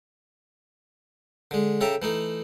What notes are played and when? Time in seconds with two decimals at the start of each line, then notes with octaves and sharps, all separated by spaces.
1.51 D3 G#3
1.81 C#3 A4 E5 G5 A#5
2.02 E3 A3 D#4